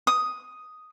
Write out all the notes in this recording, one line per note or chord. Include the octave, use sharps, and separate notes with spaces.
D#6